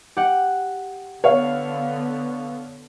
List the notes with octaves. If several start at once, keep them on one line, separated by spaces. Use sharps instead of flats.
G4 F#5
D3 B3 C#5 F5